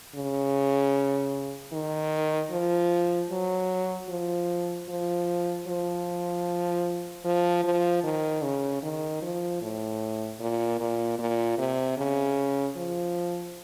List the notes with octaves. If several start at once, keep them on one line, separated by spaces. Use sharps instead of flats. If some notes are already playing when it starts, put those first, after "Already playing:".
C#3
D#3
F3
F#3
F3
F3
F3
F3
F3
D#3
C#3
D#3
F3
A2
A#2
A#2
A#2
C3
C#3
F3